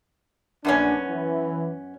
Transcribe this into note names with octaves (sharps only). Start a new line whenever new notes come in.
A#1 F#2 B3 C#4 D4
E3